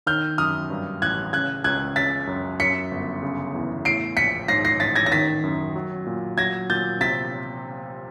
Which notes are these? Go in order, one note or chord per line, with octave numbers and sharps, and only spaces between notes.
D#3 F6 G6
F#2 D#6 F6
G2
A1 F#6 G#6
C#3 F#6 G#6
C#2 F#6 G#6
C#3 A6 B6
F#2
F#2 B6 C#7
G1
C#3
E2
A2 C7 D7
A#1 B6 C#7
G#2 A#6 C7
A#6 C7
A1 A6 B6
G#6 A#6
A#6
D#3 A6 B6
F#2
F#3
A#2
F#3 G#6 A#6
A#2 G6 A6
C3 A6 B6